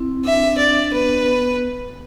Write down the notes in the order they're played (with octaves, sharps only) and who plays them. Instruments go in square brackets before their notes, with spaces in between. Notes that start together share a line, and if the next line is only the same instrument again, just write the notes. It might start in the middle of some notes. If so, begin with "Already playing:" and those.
Already playing: [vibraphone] C4 E4
[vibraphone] D4 [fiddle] E5
[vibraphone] D4 [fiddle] D5
[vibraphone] B3 [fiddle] B4
[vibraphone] B3